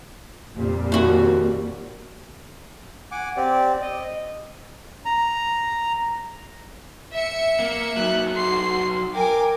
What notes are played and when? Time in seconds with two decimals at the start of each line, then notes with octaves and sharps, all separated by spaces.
0.55 F2 A#2 G3
0.92 D#2 F#4
3.12 F#5 G#5 D6
3.37 C4 G4 D5
3.82 D#5
5.05 A#5
7.13 E5 C#7
7.60 A#3
7.97 F#3 D#4 F#6
8.35 F#4 C6 C7
9.14 A#4 G5 G#5 D6